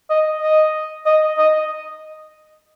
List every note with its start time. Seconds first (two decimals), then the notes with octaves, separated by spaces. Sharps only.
0.10 D#5
0.42 D#5
1.06 D#5
1.38 D#5